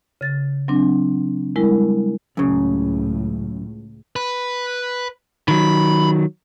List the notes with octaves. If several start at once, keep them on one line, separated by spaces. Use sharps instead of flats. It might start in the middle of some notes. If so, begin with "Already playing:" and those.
C#3 A6
F#3 C4 D4
G3 G#3 E4 A#4
C#2 F#2 A2 C#3
B4
D#3 F#3 B5